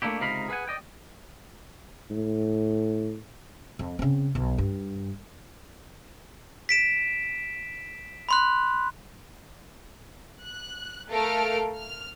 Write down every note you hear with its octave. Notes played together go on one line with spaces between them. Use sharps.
A3 A#3 D4 E4 G4
C#2 C3 D#4 A#4 F5 B5
G#4 B4 F5 F#5 G#5
D5 D#5 G5
A2
F2
C#3 C4
B1
G2
B6 D7 E7
B5 C6 F#6
F#6
A3 A4 A#4 F5 F6 D7
F6